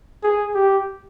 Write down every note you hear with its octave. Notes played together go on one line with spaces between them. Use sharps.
G#4
G4